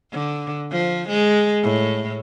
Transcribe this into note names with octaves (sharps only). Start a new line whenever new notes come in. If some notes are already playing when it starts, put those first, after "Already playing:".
D3
F3
G#3
A2